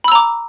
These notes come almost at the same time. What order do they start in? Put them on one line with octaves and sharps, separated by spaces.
B5 E6 A#5 D6